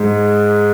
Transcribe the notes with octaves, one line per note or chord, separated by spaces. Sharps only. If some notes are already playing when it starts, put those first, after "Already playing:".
Already playing: G#2